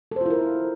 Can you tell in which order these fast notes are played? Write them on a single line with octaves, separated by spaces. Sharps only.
A4 C5 F4 E4 A#4